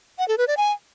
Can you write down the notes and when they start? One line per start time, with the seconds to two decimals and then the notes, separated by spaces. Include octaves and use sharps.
0.18 F#5
0.28 A4
0.38 B4
0.48 D5
0.57 G#5